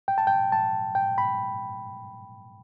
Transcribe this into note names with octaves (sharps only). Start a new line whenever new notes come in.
G5
A5
G5
A5
G5
B5